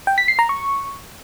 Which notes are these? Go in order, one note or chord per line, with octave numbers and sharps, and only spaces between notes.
G5
B6
C7
A#5
C#6